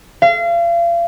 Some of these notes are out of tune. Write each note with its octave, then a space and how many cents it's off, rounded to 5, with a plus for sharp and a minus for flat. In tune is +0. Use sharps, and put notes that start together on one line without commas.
F5 -35